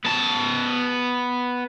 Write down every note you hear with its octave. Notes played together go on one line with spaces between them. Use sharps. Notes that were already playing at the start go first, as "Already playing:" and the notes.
B3 A5